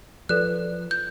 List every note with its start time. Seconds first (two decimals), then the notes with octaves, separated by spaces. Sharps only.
0.29 F3 A4 B4 D5 F#6
0.91 G6